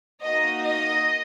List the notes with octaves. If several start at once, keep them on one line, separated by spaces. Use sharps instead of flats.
A#3 D#4 F#4 D#5
D#5